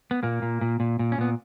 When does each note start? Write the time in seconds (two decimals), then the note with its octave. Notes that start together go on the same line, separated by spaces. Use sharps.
0.11 B3
0.23 A#2 A#3
0.42 A#2
0.61 A#2
0.80 A#2
0.99 A#2
1.12 C#4
1.18 A#2 B3